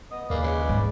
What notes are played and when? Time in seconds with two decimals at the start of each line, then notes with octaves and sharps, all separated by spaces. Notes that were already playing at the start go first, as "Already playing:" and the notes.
0.12 B3 D#5 D#6
0.30 D#2 G#3 A#3 B4 D5
0.44 C#3
0.69 G#2